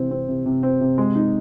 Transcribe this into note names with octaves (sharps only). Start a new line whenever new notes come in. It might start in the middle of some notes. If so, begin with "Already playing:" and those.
Already playing: C3 E3 C4
C4
C3
C3
C4
C3
G#3
D#4